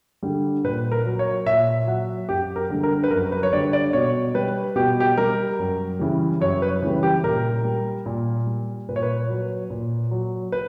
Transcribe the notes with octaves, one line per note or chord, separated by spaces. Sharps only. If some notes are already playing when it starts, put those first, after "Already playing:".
D3 G3
A#2 B4
A#4
F#3
C#5
A#2 E5
F#3 F#5
F#2 G4
A#4
D3 G3
A#4
B4
F#2 A#4
B4
C#5
D3 G3 D5
D5
B2 C#5
G3 B4
B2 G4
G4
G3 A#4
F#2
C#3 E3 G3
F#2 C#5
B4
C#3 E3 G3
G4
A#2 A#4
G3
A#2
G3
A#2 B4
C#5
B4
F#3
A#2
F#3
B4